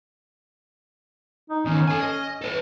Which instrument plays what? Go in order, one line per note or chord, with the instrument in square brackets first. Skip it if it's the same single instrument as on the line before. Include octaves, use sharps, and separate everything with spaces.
[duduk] D#4
[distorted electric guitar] E2 D#3 [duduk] C#4
[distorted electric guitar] A4 G#5
D#5
A4 B4